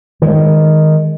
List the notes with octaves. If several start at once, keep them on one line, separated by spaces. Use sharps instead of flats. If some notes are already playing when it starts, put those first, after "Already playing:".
D#3 G#3